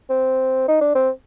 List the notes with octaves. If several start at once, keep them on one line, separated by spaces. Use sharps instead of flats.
C4
D#4
D4
C4